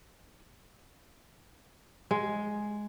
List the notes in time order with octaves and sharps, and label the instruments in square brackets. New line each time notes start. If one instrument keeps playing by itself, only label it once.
[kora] G#3